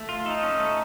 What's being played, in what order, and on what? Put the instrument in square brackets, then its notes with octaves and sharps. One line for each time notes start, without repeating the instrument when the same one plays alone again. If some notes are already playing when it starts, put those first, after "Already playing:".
Already playing: [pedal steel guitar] A3
F4
[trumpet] D#4 [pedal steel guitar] A4
[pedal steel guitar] C#4
A3